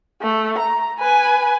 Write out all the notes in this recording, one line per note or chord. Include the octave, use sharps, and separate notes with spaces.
A3
A#5
B4 G#5